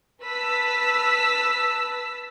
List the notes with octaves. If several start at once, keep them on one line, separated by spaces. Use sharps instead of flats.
B4 A5 E6 B6